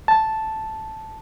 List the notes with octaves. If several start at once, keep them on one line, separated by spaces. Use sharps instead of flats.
A5